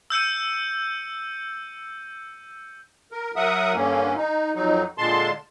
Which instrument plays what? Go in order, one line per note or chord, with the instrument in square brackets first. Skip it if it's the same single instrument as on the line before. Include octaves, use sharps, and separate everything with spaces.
[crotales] E6 G6 C#7 D#7
[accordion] A#4
F#3 A#4 E5 F#5 D#6
G2 D3 A#3 C#4
D#4
F2 F#3 D#4
A#2 D3 G#3 A5 C6